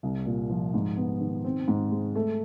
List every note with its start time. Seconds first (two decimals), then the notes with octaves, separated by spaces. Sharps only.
0.03 C2
0.26 A#2
0.50 F3
0.74 G#2
0.97 B3
1.21 D#3
1.45 C4
1.68 G#2
1.91 G#3
2.15 A3